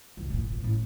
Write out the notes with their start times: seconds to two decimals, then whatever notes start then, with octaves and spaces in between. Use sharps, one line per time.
0.17 F#1 C#2
0.30 A#2 C#3
0.50 G1
0.64 A2 C#4